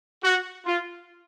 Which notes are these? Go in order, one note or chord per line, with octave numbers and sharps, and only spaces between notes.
F#4
F4